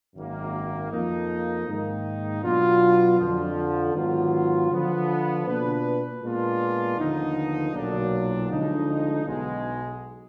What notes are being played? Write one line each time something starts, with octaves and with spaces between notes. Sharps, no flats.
G#1 F#2 D#3 A#3
F2 F3 A#3 D#4
G#2 D#3 A#3 D#4
B2 F#3 B3 D4 F4
F2 D3 F3
G#2 D#3 F#3 B3 F4
D3 F3 B3
B2 A#3 D4 F4 B4
A#2 G#3 B3 D4 F4
D#2 D3 F3 B3 D#4
B1 A#2 F#3 D4
D2 D3 F3 G#3 D#4
B1 B2 G#3